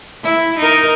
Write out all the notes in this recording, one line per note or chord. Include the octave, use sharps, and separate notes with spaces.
E4
D#4 A#4